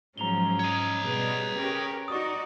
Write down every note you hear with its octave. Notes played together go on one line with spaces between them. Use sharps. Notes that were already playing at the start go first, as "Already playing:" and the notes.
G#2 F3 F#3 C#4 A#5 F7 G7
C#5 D#5
B2 G3 G#4 B4
C#4 G4 A#4
D#4 F#4 D5 C#6 D#6